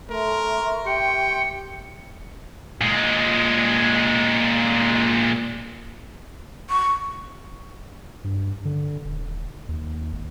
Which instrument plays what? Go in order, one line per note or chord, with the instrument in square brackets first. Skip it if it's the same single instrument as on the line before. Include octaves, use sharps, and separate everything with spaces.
[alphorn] A3 [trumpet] A#4 [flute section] E5 C6 C#6
[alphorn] G4 [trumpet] G5 [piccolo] C#7
[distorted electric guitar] A#2 G#3
[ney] C#6
[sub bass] G2
D3
D#1
D#2
G#1